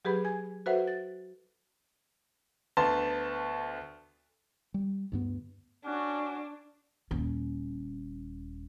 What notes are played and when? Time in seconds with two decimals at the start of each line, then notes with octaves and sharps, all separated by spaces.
0.05 F#3 G4 G#4 B4 B5
0.25 G#5 G#6
0.66 F#4 A4 B4 C5 E5 F#5
0.87 A6
2.77 D2 B3 A5 C6
4.74 G3
5.12 D2 G2 B3
5.85 C#4 D4 F#4
7.11 D#1 C#4